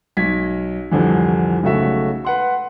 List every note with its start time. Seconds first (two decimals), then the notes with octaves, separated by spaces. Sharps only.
0.17 B1 G#6 B6
0.91 C2 F2 D3 E3
1.63 B1 C#3 A3 F#4 E5
2.25 B4 F#5 C6